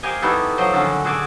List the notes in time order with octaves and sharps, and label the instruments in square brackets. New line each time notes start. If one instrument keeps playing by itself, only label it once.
[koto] G4 A#4 C5 D#5 F5 G#5
B3 D#4 E4 F#4 G4 A4
F3 F#3 C5 D#5
D3 D#3 C#4 F#4 A4
F#4 G#4 A4 D5 G#5